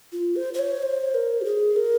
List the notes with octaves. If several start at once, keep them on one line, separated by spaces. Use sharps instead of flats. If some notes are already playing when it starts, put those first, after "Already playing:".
F4
C5
C5
C#5
C5
A#4
F#4
G#4
A#4